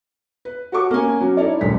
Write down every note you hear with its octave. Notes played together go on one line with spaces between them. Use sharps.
B4
F#4 G4 A4 C#5 C#6 D6
A#3 C#4 G#5
F#3 C#4
D#4 E4 A4 C#5 D5
D#1 B1 G2 G#3 A4 B6